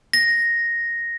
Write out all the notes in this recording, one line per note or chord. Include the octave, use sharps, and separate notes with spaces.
A#6